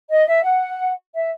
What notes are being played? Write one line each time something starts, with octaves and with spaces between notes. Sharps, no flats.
D#5
E5
F#5
E5